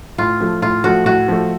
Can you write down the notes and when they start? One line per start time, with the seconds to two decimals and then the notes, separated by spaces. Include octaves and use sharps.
0.18 A2 F4
0.40 F3 A3
0.62 A2 F4
0.84 F3 A3 F#4
1.06 A2 F#4
1.28 F3 A3